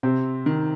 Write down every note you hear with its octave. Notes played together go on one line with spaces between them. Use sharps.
C3 C4
D#3